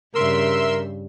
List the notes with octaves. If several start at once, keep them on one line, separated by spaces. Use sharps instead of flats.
G2 C#3 A#4 E5 C6 E6